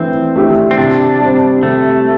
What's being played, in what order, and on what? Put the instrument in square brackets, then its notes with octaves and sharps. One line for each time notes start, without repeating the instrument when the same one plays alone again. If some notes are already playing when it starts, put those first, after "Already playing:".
Already playing: [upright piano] E3 A3 D4 [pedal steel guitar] C4
[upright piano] A3 D4 G4
[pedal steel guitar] C4
[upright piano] C3 [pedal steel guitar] D4
[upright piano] G3 C4
[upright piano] C3 [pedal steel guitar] A3